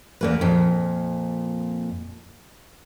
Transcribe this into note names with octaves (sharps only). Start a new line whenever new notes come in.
E2 A#3 B4
F2 A#2